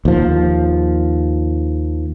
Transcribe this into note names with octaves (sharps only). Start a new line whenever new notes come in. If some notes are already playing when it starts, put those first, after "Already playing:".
D#2 F3